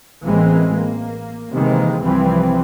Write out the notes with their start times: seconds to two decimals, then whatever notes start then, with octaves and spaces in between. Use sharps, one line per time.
0.25 A1 E3 G#3 A#3 C4
0.74 A#3
1.53 C3 D#3 E3 G#3 A#3
2.02 C2 C3 E3 F3 G3 C4